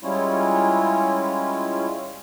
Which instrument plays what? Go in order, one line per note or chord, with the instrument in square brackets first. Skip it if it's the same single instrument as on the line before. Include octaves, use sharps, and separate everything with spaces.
[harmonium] G3 G#3 C#4 E4 F4 C#5